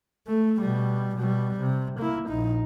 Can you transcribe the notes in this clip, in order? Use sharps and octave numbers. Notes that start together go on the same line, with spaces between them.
A3
B2 G3
B2 G3
C3
A#3 E4
A#1 D#4